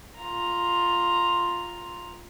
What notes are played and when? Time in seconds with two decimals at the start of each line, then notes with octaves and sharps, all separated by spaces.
0.20 F4 A#5